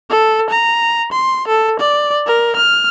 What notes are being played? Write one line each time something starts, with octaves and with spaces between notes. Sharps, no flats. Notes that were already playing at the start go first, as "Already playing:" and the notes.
A4
A#5
C6
A4
D5
A#4
F6